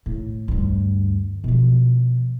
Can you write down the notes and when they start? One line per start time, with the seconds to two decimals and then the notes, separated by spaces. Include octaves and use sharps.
0.06 A2
0.48 D2 G2
1.44 B2 F3